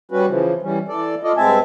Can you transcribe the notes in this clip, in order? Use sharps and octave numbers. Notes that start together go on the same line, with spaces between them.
G3 C#4 F#4 B4
C#3 E3 F3
E3 G3 C#4
E3 A4 D5
F4 A4 D5 D#5
G2 G#3 C4 E5 G#5 A5